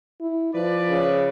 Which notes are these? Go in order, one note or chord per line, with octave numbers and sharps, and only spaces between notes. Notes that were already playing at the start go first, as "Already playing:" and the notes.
E4
F3 B4 D5
C#3